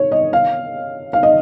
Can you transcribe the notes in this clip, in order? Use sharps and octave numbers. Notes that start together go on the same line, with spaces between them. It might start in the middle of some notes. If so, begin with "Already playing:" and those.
Already playing: C#5
D#5
F5
F5
D#5